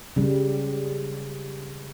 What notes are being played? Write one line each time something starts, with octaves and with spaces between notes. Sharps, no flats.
C#3 G3